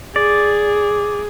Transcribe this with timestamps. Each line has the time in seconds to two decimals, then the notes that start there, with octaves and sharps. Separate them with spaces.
0.16 G#4 D5